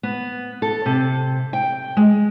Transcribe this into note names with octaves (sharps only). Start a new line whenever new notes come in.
B3
A4
C3
G5
G#3